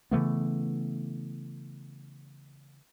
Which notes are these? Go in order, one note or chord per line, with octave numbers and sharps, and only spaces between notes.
C#3 E3 A3 B3